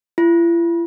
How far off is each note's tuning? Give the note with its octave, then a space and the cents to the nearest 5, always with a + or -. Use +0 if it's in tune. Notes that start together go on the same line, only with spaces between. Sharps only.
E4 +45